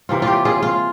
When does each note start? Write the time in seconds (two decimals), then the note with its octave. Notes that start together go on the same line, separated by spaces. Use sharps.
0.09 C3 E3 A#3 F4
0.22 F4
0.27 G4
0.45 F4 G#4
0.62 F4